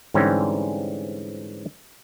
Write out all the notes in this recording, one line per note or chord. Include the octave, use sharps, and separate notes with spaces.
G#2 D3 E3 G3 C4 C#4